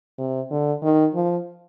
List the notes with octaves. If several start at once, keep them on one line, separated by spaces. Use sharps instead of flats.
C3
D3
D#3
F3